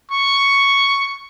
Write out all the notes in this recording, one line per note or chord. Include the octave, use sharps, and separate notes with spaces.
C#6